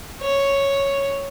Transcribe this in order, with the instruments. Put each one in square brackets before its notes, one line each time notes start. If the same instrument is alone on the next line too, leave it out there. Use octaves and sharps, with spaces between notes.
[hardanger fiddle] C#5